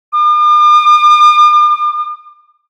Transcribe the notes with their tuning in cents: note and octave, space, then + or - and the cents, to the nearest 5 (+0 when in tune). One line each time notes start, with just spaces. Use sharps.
D6 +45